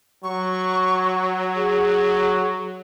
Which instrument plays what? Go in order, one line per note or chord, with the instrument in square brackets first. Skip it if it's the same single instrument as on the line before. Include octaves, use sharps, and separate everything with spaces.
[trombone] F#3 [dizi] C#6
[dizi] G#4